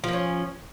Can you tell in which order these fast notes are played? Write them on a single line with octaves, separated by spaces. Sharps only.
F3 A#3 C#4